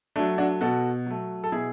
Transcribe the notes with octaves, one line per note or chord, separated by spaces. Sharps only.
F#3 A3 D4
D4 F#4
B2 F#4 A4
F#3 A3
A4
B2 E4 G#4